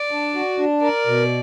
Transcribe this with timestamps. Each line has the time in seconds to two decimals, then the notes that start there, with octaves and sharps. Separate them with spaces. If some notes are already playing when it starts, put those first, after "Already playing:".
Already playing: D5
0.11 D4
0.35 F#4
0.59 D4
0.82 A#4 D5
1.07 B2